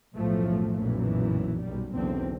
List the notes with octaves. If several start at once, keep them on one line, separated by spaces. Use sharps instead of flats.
B1 F#2 A2 E3 F3 A3
B1 F#2 A#2 E3
B1 G3
F#1 B1 E2 D3 C4